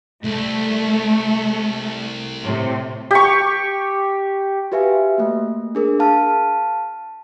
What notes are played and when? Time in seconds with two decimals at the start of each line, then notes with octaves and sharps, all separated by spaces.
0.24 C2 A3
2.43 A2 C3
3.11 G4 C#6
4.72 F#4 G4 B4 E5 F5 G#5
5.18 A3 A#3
5.75 D4 G#4 A#4
6.00 F5 A5 F6